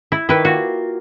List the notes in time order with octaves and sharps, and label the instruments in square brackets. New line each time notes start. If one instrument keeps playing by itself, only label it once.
[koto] E4
[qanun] D#3 D5 G5 [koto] E4 B4
[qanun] A#3 F4 [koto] F#4